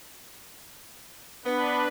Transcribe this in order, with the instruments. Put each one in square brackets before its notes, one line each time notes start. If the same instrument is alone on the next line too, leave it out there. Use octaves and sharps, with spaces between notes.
[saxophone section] B3 [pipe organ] D4 B4